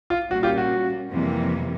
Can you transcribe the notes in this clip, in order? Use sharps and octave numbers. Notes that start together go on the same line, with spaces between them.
F4
A#2 G3 A#3 C#4 F#4
F4 G4
F#4
F2 C3 E3 G3 A#3